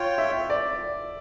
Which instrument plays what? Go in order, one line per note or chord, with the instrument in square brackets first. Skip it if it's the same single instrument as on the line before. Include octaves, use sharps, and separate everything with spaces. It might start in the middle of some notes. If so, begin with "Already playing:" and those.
Already playing: [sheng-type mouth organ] F4 C#5 G5
[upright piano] E5
D5